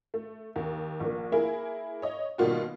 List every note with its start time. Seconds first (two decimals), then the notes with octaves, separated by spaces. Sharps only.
0.14 A3
0.56 D#2
1.00 A#1 A#3
1.32 A#3 E4 G#4 A#4
2.02 C#5 D#5
2.38 B2 D#3 G3 A#3 F4 F#4